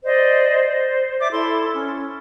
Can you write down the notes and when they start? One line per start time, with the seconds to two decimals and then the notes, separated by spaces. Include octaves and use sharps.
0.04 C5 D5 D#5
0.64 C5
1.20 D5 E5 D6
1.31 E4 A4 C6
1.74 C#4